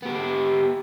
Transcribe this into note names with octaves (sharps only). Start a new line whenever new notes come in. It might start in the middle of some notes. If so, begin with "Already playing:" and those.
B3 G4